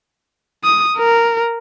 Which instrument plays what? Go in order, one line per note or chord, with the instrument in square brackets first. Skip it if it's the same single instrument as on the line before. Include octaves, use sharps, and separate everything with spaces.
[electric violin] D#6
A#4